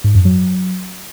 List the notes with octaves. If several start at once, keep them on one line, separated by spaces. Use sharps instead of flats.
G#2
F#2
F#3